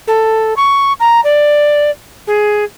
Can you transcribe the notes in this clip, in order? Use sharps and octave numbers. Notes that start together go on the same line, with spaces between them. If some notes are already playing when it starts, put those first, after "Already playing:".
A4
C#6
A#5
D5
G#4